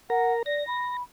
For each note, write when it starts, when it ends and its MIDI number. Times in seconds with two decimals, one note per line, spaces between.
0.10 0.43 70
0.10 0.33 78
0.10 0.43 82
0.46 0.66 74
0.46 0.97 94
0.67 1.03 83